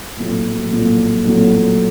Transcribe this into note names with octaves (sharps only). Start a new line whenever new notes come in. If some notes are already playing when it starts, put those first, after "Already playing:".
A#1 A2 F#3
A#1 A2 F#3
A#1 A2 F#3